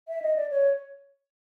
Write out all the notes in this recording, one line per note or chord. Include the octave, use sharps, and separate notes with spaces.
E5
D#5
D5
C#5